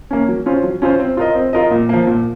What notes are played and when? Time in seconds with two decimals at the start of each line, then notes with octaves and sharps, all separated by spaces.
0.11 A#3 C#4
0.29 F#3
0.46 C#4 F4 C5
0.64 F#3
0.82 C#4 F4 C5
1.00 C4
1.17 F4 A#4 D#5
1.35 C4
1.53 F4 A#4 D#5
1.71 A#2
1.89 F3 A#3
2.07 A#2